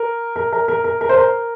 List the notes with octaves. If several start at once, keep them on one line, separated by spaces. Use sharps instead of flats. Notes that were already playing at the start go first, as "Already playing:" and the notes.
Already playing: A#4
A#4
A#4
A#4
A#4
A#4
C5
A#4